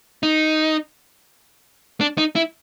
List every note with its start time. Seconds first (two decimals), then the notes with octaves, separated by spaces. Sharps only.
0.23 D#4
2.01 D4
2.18 D#4
2.36 E4